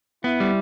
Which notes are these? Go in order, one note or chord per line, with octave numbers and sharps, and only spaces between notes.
B3 E4
G3